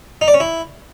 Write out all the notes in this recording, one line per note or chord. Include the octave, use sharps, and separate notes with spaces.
D#4
D5
C#4
E4